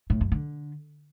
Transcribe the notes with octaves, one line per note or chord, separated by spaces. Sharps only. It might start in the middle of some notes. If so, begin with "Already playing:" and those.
A2
F#2
D3